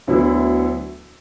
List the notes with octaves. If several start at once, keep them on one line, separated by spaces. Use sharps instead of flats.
D2 D3 F#3 B3 E4